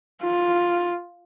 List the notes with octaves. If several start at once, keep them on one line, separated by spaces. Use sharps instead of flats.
F4